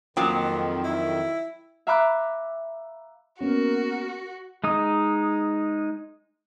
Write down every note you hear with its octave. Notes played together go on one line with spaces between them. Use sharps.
F2 D#3 F3 F#3 A#3 G5
E4
E5 F5 A#5 B5 D6 F#6
A#3 B3 C#4 F#4 A#4
G#3 D#4 D#6